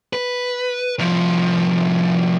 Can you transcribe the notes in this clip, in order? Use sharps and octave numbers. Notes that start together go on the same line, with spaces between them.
B4
C2 F3